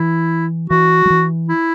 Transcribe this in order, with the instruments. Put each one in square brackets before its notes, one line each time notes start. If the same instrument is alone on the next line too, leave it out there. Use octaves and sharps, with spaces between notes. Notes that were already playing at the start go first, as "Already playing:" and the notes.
Already playing: [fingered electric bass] E3 [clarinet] E4
[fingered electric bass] E3 [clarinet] F#4
[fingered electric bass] F#3
E3
[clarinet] E4